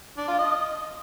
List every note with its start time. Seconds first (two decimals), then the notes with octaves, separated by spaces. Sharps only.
0.18 D4
0.28 F4
0.38 D#5